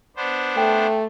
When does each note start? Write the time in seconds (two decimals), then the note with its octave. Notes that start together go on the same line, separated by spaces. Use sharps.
0.16 B3 D4 C5
0.57 A3 G5